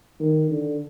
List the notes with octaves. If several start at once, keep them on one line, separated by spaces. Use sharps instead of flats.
D#3
D3